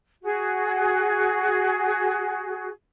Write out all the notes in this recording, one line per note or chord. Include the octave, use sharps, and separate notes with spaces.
F#4 G#4